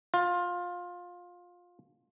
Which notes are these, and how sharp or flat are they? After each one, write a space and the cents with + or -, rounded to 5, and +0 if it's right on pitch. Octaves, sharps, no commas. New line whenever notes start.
F4 +20